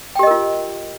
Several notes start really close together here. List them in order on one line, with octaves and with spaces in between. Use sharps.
G5 G4 D#5 A#4 F4